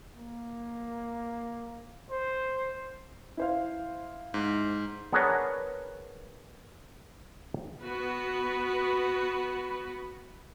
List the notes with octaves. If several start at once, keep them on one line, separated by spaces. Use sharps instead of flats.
A#3
C5
E4 C5 F5
G#2
B3 D4 G#4 A#4 B4 C#5
B3 F#4 B4